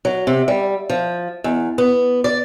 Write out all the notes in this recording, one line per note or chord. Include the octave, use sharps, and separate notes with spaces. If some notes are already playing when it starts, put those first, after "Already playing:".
F#3
C3
G3
F3
E2
B3
D5